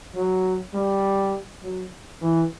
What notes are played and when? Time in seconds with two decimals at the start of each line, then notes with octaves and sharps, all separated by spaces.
0.14 F#3
0.74 G3
1.62 F#3
2.21 E3